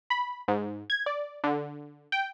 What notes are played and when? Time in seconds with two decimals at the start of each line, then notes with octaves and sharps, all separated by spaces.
0.10 B5
0.48 G#2
0.90 G#6
1.06 D5
1.44 D3
2.12 G5